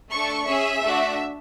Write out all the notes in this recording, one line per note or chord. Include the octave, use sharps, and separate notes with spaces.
A3 D4 A4 C#6
C#4 G#4 E5
A3 D4 F#4